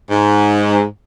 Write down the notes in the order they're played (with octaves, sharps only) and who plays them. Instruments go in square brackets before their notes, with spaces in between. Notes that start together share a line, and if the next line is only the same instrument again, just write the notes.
[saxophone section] G#2